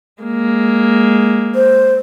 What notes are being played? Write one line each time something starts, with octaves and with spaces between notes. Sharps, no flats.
G#3 A#3
C5